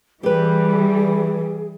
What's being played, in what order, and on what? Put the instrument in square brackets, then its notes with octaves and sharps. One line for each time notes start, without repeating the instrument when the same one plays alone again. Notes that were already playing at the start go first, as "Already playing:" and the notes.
[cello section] E3 G3 [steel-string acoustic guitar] G4 B4 [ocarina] G#4